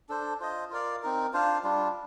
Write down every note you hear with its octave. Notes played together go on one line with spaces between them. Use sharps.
D4 A4 C5
F4 C5 D#5
F4 A#4 D5 F5
C4 D#4 A#4
D4 F4 C5 F5
G3 D4 F4